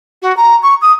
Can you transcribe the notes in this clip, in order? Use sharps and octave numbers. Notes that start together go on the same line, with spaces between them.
F#4
A#5
C#6
D#6